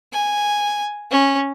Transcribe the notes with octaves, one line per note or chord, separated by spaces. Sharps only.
G#5
C#4